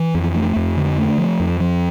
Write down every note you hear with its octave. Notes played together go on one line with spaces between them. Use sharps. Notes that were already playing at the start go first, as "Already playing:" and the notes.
Already playing: E3
F2
A3
F2
D3
A3
F3
F2
F3